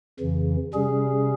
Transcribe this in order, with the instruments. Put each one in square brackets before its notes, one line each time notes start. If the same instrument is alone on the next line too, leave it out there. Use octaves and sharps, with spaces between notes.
[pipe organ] F2 C#3 E3
C3 G3 C#4 G#4